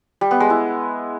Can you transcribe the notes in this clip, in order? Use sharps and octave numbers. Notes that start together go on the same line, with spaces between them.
G3
B3
G#3
E4